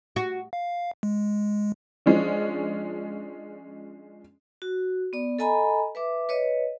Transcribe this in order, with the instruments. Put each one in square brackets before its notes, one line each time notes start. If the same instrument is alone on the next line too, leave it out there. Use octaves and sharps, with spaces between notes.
[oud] F#4
[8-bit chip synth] F5
G#3
[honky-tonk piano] F3 G#3 C#4 D4
[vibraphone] F#4
B3 D5
A4 D#5 G#5 A#5 B5
B4 E5 D6
B4 C#5 D#5